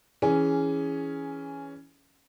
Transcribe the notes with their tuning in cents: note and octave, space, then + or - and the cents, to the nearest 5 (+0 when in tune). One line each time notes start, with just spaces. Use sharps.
E3 +0 C#4 +5 G#4 +0